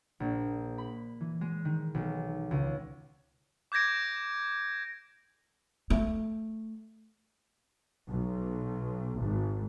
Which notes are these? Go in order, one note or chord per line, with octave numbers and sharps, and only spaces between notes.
A#1
B5
E3
G#3
D#3
B1
C#2
D6 G6 G#6 A#6 D7
A3
B1
G#1